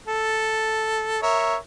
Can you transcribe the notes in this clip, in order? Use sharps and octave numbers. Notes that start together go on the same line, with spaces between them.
A4
A#4 C#5 E5